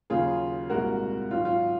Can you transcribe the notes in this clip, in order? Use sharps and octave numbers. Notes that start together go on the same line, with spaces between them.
D#2 C#3 F#3 F4 G#4
C2 A#2 G#3 F#4 A#4
G#2 D#3 F#3 F4
F4